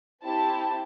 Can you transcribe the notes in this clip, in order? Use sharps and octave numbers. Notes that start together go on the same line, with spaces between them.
C4 E4 G4 A5